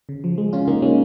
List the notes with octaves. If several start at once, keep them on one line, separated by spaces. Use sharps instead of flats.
C#3
F3
G#3
C#3 C#4 F4
C#3 A#3 D#4
C#3 G#3 C#4